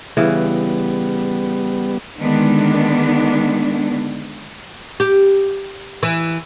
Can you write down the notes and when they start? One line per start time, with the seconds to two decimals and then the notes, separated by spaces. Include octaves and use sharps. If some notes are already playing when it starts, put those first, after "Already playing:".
0.17 C#3 E3 G3 B3
2.19 D3 D#3 G#3 B3 D4
5.00 G4
6.03 E3